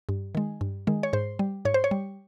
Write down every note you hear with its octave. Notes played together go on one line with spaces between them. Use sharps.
G2
D#3 G#3
G2
D#3 G#3
C#5
G#2 C5
G3
G#2 C#5
C5
C#5
G3